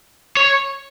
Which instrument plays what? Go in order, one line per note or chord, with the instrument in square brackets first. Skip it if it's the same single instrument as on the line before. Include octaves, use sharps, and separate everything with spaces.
[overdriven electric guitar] C#5